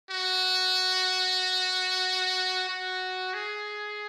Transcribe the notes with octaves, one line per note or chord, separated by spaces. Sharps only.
F#4
F#4
G#4